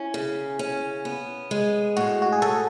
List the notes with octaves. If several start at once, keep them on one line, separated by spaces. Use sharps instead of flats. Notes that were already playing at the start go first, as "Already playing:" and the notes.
Already playing: C#4 E4
C#3
C#4
B3
G#3
A2 F#4
F#4
G#4
A2 A4